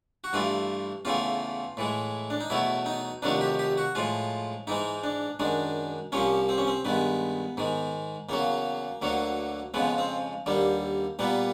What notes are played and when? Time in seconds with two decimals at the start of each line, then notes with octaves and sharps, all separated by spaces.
0.24 F#4
0.33 G2 E3 A3 F4
1.05 E2 C#3 E3 A3 F4
1.77 A2 E3 G#3
2.30 D4
2.40 D#4
2.50 E2 B2 F#3 A3 E4
2.86 D#4
3.22 F2 C3 D#3 F#3 A3 D4
3.41 G4
3.59 G4
3.78 F#4
3.95 A2 F3 G#3 F4
4.67 G#2 E3 G#3 D#4
5.04 D4
5.39 F#2 D#3 G#3 D4
6.12 C2 C3 F3 A#3 C#4
6.49 C4
6.58 C#4
6.67 C4
6.85 G2 D#3 G#3 B3
7.57 G#2 D#3 G#3
8.29 E2 C#3 F#3 A#3
9.02 D2 D3 F#3 A#3
9.74 F2 C#3 F3 G#3 B3
9.98 C4
10.46 D#2 D3 G3 A#3
11.19 A#2 G3 A#3 B3